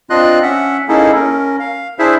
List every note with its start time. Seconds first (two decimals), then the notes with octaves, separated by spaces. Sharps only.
0.10 C4 D4 F4 D#5 C6 F#6
0.43 C#4 E5 F#5
0.88 A#3 C#4 D#4 E4 G#4 A4
1.15 C#4 A#4
1.60 F5
1.99 D4 E4 G#4 C5 E5